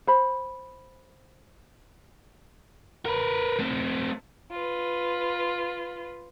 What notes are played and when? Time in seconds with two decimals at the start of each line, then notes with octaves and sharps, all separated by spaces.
0.07 C5 B5
3.06 A#4 B4
3.59 A3 C4
4.51 F4 B4